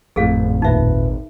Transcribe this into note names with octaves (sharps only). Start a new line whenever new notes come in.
G#1 F2 A2 G#4 A4 F5
D#2 A#2 D#4 B4 E5